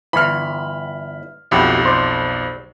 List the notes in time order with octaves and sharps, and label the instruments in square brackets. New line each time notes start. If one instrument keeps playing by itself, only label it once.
[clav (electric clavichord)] G1 E3 [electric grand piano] B5 F6
[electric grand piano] B1 F2 [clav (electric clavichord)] E4 F#4 G4
[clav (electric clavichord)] C5 D5